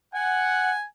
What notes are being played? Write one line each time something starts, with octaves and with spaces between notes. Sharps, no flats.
F#5 G#5